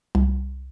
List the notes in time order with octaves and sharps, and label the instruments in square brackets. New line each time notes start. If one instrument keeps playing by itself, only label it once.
[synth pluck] C2